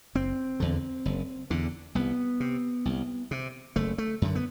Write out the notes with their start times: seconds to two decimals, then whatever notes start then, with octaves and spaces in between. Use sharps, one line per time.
0.15 F#1 C4
0.60 E2 D3
1.05 F#1
1.50 E2 D3
1.95 C2 B3
2.40 C3
2.85 C2
3.31 C3
3.76 F#1 A3
3.98 A3
4.22 F#2 D3
4.35 B3